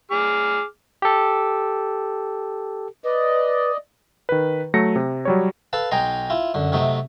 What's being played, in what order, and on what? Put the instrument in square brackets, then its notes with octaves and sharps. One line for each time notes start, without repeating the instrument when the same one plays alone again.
[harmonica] G#4 D6 F6
[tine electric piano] G4 A4
[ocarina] B4 [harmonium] D5 D#5
[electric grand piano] D#3 B4
F#3 A3 A#6 C#7
C3
F#3 G3 C#5
[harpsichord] A4 B4 F5 A5
B1 D#4 G5 G#5 A#5 C6
E4 F4
F#2 D3
C3 F#3 A3 D#4